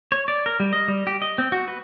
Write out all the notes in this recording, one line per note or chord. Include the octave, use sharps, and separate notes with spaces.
C#5
D5
A#4
G3
D#5
G3
G4
D#5
C4
F#4
B4